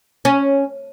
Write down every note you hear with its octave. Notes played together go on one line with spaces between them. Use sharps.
C#4